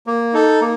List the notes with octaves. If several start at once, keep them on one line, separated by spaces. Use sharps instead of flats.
A#3
D#4 A4
A#3